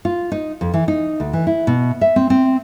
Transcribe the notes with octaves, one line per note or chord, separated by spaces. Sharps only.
F4
D#4
F2
E3
D#4
D2
E3
E4
B2
E5
C4
C4